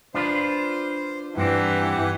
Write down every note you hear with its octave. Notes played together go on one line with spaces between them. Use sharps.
D4 F4 B4 C5
G2 E3 C4 D4 G4 F#5